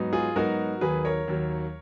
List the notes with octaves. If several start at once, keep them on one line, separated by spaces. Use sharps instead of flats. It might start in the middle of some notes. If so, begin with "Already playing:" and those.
Already playing: G#2 F#3 B3 D#4
F4 G#4
G#2 F#3 B3 D#4 F#4 A#4
D#2 D#3 F#3 G#4 B4
A#4 C#5
D#2 D#3 F#3